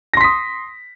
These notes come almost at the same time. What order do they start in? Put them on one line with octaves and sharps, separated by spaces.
A#6 C6 B6 D#6